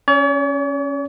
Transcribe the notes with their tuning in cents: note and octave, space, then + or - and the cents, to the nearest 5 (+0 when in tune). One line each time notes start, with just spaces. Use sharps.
C#4 -5 C#5 +45